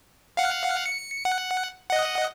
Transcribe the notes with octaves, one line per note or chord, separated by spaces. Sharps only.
F5 F#5
C#7
F#5
D#5 F#5